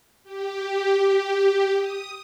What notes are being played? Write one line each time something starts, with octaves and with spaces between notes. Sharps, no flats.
G4
D#6